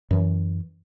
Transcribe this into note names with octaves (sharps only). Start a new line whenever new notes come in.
F#2 E3